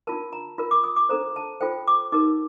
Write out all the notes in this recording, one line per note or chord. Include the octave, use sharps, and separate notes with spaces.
D4 F4 A#4 A5
A#5
F4 A#4
D6
D#6
D6
D4 A4 C5 A#5
A5
F4 A4 C5 G5
D6
D#4 G4 A#4 D6